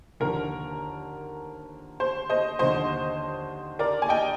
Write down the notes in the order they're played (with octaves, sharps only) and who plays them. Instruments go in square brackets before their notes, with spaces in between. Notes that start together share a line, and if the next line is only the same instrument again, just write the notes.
[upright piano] D#2 D3 F3 A#4
C5
C5 D#5
D#2 D3 F3 C5 D#5
A#4 D5
G#5
D#5 G5